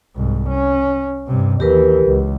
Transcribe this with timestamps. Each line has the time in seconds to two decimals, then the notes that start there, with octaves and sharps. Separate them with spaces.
0.16 C2 G#2
0.49 C#4
1.27 G2 C3
1.60 D#2 E3 G4 A#4 B4
2.06 C#2